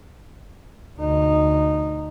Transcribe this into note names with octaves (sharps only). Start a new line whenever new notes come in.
D2 D#4